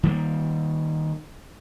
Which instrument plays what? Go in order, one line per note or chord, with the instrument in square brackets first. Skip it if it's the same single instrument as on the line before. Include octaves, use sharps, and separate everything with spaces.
[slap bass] D#3 G3 A#3